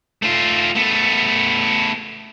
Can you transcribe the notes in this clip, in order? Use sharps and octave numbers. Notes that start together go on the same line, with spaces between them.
A3 F4
A3 B3